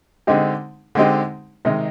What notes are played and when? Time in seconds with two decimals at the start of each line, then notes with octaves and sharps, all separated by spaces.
0.27 D3 G#3 C4 D#4 G4
0.95 D3 G#3 C4 D#4 G4
1.65 C3 D#3 G#3 D#4